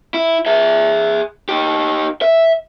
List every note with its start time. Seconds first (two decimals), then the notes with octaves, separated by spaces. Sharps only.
0.14 E4
0.46 G#4 E5
1.49 D#4 G4
2.22 E5